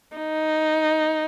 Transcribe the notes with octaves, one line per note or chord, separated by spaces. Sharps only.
D#4